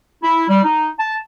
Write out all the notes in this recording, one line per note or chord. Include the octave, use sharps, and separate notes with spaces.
E4
G3
D#4
A5